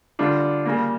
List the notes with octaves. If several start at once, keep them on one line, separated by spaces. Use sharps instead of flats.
D3 G3 D4 F4
C#3 G3 A#3